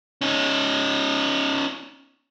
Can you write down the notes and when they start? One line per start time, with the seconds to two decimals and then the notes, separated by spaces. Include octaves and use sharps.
0.21 C#4 D#4